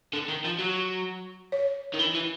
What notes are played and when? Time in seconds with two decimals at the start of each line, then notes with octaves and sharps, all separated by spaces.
0.13 D3
0.28 D#3
0.44 F3
0.59 F#3
1.52 C#5
1.94 D#3
1.99 E3
2.15 E3